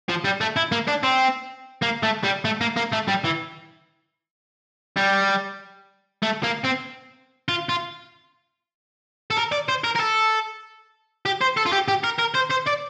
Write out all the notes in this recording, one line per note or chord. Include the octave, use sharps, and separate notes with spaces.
F3
G3
A3
E4
A#3
D4
C4
A#3
A3
G3
A3
A#3
A#3
A3
G3
E3
G3
A3
A#3
C4
F4
F4
A4
A#4
D5
C5
A#4
A#4
A4
G4
C5
A4
F4
G4
G4
A#4
A#4
C5
C5
D5